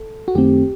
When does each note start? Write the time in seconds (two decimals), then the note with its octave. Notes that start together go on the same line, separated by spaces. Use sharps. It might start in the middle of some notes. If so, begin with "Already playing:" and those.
Already playing: A4
0.28 F#4
0.35 F#2 D#3 A3 C4 G4